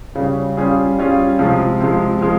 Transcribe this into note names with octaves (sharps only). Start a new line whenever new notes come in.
C#3 G3 C#4 G#4
G3 C#4 F4 G#4
G3 C#4 F4 G#4
C3 F3 G#3
C3 F3 G#3
F3 G#3